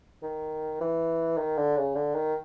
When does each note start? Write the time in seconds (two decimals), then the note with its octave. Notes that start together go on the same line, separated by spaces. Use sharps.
0.22 D#3
0.81 E3
1.38 D#3
1.58 D3
1.77 C#3
1.95 D3
2.15 D#3